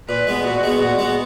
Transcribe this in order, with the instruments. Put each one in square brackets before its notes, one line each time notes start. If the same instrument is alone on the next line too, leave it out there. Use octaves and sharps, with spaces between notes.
[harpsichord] A#2 [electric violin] B4
[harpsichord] G#3 B3
[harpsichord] A#2 [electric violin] F#4
[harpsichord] G#3 B3
[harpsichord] A#2 [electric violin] F#4
[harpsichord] G#3 B3